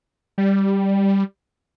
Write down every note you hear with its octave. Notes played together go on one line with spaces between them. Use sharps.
G3